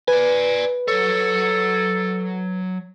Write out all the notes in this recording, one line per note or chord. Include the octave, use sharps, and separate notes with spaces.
B4 D5 G#5
F#3 A4 C#5